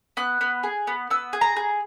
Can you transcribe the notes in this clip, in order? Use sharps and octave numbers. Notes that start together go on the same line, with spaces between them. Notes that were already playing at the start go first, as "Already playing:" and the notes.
B3 F#6
B3
G#4
B3
B3 E6
G#4
A#5
G#4